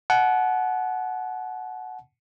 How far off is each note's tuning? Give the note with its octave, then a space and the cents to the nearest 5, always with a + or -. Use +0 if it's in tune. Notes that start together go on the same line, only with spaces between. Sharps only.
F#5 +0 A5 -40